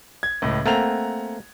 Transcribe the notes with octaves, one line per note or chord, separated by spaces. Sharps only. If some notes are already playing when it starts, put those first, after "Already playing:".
G#6
C#2 A2
A3 A#3 C4 F#5 A#5 F7